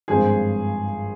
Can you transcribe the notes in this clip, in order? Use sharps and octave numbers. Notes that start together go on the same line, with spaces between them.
G#1 G2 F3 G#4 C5